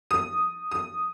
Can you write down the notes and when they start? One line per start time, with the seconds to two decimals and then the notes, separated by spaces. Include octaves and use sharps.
0.11 D#6
0.71 D#6